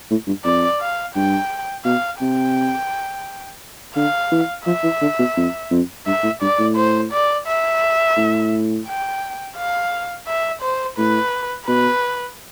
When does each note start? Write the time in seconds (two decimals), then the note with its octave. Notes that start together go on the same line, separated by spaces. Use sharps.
0.11 A2
0.27 G2
0.45 F2 D5
0.81 F5
1.15 G2 G5
1.85 B2 F5
2.21 C3 G5
3.95 D3 F5
4.31 E3
4.66 F3 E5
4.83 E3
5.01 D3
5.19 B2
5.37 F2
5.71 F2
6.06 G2 E5
6.23 A2
6.41 G2 D5
6.59 A2
6.76 C5
7.12 D5
7.47 E5
8.17 A2
8.87 G5
9.57 F5
10.27 E5
10.62 C5
10.97 A2 B4
11.67 B2 B4